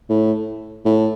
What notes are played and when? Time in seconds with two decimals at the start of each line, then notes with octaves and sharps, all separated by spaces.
0.10 A2
0.85 A2